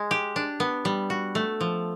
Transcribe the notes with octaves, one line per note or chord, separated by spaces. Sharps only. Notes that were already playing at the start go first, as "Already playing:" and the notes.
Already playing: G#3
G4
D4
B3
G3
F#4
A3
F3